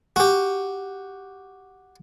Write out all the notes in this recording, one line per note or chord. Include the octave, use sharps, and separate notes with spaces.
F#4 G4